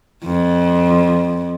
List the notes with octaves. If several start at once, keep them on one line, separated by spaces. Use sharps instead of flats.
F2